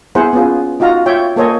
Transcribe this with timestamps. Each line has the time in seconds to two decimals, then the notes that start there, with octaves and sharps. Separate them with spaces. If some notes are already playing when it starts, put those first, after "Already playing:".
0.15 B3 E4 G#4 C5 F#5
0.33 B3 C#4 F4 G#4
0.80 D#4 F4 F#4 F5 A#5
1.06 F4 C#5 E5 G5
1.36 A#3 A4 C5 C#5 D#5 G#5